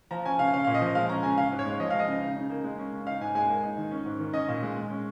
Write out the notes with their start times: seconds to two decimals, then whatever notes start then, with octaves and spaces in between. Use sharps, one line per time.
0.11 F3 A#5
0.25 C#4 G#5
0.39 C#3 F5
0.53 C#4 F5
0.64 A#2 F5
0.74 D#5
0.81 F3
0.95 G#3 F5
1.09 C#4 A#5
1.23 C#3 G#5
1.37 C#4 F5
1.52 G#2
1.59 C#5
1.66 G#3
1.80 F3 D#5
1.90 G#3 F5
1.99 D#5
2.08 C#3
2.22 D#4
2.37 C#3
2.50 A#3
2.64 G#3
2.78 C#4
2.93 C#3
3.07 D#4 F5
3.21 G#2 G#5
3.35 G#3 G#5
3.49 A#3
3.63 D#4
3.78 D#3
3.91 C#4
4.06 G#2
4.19 D#3
4.33 C#4 D#5
4.48 A#2
4.63 G#3
4.77 G#3
4.90 C#4